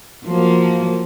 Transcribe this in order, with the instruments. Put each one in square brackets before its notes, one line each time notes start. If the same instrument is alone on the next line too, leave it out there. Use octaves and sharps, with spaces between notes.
[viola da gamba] F3 F#3 A#3